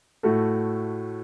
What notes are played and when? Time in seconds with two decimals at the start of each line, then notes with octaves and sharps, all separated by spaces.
0.23 A2 A3 F#4 A4